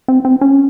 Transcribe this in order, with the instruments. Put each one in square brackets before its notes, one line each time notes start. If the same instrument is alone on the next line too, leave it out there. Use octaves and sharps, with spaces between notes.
[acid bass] C4
C4
C#4